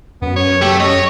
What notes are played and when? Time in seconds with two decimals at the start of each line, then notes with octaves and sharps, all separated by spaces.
0.22 F#2 B3
0.36 C#5
0.62 A3 G4
0.80 C#5 D#5